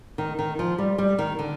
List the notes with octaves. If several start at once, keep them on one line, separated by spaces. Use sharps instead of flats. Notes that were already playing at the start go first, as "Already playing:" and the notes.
D#3
D#3
F3
G3
G3
D#3
D3